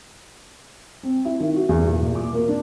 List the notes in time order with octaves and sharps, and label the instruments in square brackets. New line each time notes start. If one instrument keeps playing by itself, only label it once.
[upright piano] C4
E4
D#3
F#4
E2
A#2
A#2
D6
A#3
D4